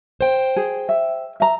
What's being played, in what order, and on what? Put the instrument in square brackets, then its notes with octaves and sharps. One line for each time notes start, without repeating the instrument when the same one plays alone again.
[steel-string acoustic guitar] C5 G5
[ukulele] G#4
E5
E5 A#5